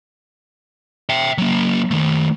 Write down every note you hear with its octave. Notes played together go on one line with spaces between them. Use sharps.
E5 G5
F#3 A#3
D#3 A3